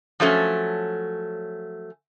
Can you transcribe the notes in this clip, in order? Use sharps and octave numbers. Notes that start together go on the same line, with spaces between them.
F3 F#3 A3 C#4